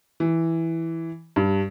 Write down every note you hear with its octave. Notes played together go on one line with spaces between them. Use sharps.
E3
G2